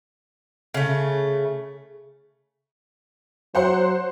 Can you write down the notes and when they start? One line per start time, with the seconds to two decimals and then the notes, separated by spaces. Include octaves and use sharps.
0.74 C#3 A3
3.55 F#3 C5 F#5 C6